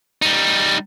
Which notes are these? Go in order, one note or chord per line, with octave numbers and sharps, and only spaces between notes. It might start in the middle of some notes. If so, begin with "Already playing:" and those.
G3 D#4